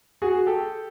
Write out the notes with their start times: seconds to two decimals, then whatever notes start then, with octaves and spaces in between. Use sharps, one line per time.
0.22 F#4 G#4
0.46 G4 A4